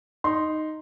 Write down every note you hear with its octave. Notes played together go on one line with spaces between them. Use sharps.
D#4 C6